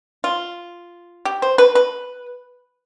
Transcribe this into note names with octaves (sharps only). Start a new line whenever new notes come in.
F4
G4
C5
B4
B4